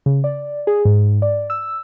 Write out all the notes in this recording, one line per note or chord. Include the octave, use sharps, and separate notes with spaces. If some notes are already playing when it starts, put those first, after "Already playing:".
C#3
D5
G#4
G#2
D5
E6